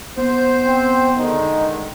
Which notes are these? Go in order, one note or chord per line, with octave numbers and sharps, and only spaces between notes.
B3 C5
C4
D3 D#3 G#3 D#4